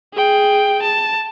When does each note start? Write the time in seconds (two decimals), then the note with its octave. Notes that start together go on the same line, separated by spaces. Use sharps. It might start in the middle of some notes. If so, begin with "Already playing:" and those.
0.13 G#4 G5
0.82 A5